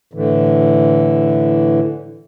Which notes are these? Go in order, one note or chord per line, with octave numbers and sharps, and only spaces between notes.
A2 D3 E3